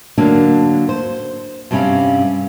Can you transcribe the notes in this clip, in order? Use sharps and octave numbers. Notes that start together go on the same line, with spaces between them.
D3 F#3 A#3 D4
C5
G2 C3 G3 C#4 F5